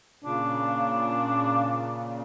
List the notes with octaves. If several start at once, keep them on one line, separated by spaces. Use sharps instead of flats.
A#2 C#3 D4